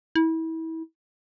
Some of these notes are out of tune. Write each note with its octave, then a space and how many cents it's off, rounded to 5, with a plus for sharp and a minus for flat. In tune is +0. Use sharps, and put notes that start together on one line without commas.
E4 -30